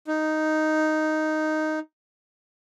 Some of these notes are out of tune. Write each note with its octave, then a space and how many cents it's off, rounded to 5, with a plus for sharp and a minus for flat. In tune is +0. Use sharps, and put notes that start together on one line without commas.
D#4 +0